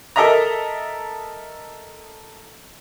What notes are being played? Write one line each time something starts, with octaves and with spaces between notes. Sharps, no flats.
A4 A#4 D#5 E5 A#5